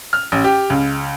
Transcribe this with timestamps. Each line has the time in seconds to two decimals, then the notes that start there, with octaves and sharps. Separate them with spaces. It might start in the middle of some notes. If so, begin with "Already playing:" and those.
0.13 F6
0.32 A1
0.44 G4
0.70 C#2